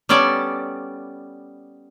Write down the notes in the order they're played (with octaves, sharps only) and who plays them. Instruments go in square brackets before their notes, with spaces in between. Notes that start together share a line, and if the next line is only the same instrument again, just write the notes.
[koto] G3 B3 C#4 A4 D5